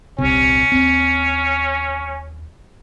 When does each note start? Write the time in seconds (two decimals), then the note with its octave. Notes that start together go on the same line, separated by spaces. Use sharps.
0.18 D#1 C2 C3 C#4
0.72 D#2 C4